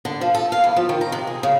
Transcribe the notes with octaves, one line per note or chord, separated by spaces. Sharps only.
D3
F3
A4
F5
E2
F3
D#3
A#5
C3
G#4
C#3